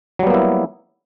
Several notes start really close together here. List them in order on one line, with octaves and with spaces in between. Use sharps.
F#3 G3 B3 A#3 E4